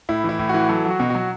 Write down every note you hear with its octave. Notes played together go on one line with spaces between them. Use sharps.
A2 E4
E3 E4
A2
F#4
E3
F#3 A4
F#3
F#4
B2
F#3 F#4